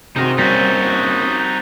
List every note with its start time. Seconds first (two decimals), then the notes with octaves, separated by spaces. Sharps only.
0.16 C3 C4 D#4 F#4 G#4 A#4
0.38 G3 A#3 C#4 D#4 F#4 G6 A6 B6